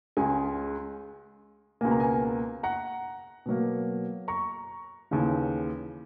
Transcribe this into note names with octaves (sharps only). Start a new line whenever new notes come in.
C#2 C#3 G#3 G#5
C#2 B2 A#3 G#5
A#5
G#5
F#5 A#5
B2 F#3 A#3
A#5 C#6
D#2 C#3 E3